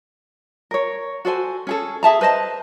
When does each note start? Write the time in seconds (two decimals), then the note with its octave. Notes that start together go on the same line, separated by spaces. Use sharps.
0.71 A#4 C#5
1.25 F#4 A4 C5 G#5
1.67 C#4 G#4 A4
2.03 G#4 E5 A5 A#5
2.21 B4 C5 D#5 A5